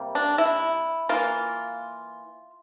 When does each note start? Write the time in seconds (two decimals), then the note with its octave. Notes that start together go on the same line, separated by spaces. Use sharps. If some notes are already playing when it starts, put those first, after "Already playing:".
Already playing: C3 G3 A#3
0.15 D4
0.38 E4
1.09 E3 A#3 F4